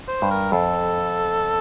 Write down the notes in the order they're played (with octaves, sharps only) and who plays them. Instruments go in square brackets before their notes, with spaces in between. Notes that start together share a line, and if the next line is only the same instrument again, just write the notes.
[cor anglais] C5
[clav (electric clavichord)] G2
[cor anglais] A#4
[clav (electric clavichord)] F2 [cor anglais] A4